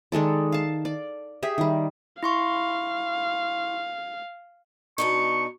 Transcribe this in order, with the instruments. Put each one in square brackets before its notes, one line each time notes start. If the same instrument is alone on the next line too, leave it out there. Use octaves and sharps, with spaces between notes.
[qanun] D#3 G#3 A4 D5
F5 A5
D5
G4 G#4 E5
D#3 G3
[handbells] E4 C6 C#6 [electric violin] F5
[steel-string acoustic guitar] B2 D4 D#4 [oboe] C#6